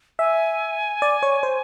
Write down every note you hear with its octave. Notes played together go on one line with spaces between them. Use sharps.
E5 G#5
D5
C#5
C5